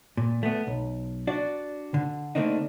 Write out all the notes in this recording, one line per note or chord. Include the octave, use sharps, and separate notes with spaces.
A#2
A3 B3
B1
D4 F#4 D5
D3
D3 A3 A#3 C4 D4 D#4